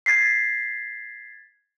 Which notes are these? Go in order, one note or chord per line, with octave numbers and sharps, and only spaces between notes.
G#6 A6 B6 C7